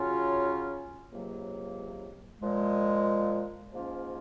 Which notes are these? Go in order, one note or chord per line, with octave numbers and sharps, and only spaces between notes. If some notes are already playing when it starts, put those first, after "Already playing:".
Already playing: C#3 F#3 C#4 F4
C#2 C3 F#3 A#3
A#2 F3 G#3
G#2 F3 A#3 C#4 F4